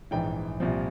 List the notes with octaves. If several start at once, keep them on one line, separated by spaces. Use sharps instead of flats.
A#1 G#2 E3 G5
C2 A#2 F3